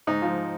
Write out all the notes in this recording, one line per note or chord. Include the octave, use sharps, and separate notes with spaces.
G#2 D#4
F3